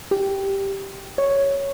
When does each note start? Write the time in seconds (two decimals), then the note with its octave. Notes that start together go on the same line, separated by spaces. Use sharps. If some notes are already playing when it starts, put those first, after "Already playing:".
0.11 G4
1.18 C#5